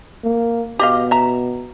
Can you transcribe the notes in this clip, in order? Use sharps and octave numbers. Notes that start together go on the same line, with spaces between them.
A#3
B2 G4 D#5 F5
E5 A#5